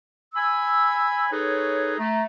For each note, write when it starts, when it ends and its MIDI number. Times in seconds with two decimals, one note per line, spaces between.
0.35 1.29 80
0.35 1.29 83
0.35 1.29 88
1.30 1.97 63
1.30 1.97 68
1.30 1.97 69
1.30 1.97 71
1.30 1.97 73
1.97 2.24 57
1.97 2.24 82